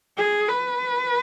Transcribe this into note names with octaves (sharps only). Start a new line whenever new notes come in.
G#4
B4